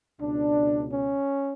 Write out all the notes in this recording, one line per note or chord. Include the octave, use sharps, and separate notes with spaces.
C#2 B2 D4
C#4